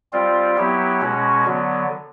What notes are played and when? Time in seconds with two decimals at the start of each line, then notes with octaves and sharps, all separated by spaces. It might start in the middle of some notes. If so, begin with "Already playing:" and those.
0.13 G3 C4 F4
0.57 F#3 B3 E4 G4
1.01 B2 G#3 C#4 F#4
1.45 D3 F#3 B3